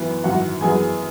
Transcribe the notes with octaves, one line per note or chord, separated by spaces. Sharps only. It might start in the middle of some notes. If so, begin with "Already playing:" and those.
Already playing: F#2 E3 B3
G#1 F#2 E3 F#4 F#5
F#2 E3 B3 G#4 G#5